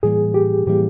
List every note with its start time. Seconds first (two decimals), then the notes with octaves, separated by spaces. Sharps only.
0.03 A2 E3 G3 A#3 G#4
0.34 G4
0.67 A2 E3 G3 A#3 G4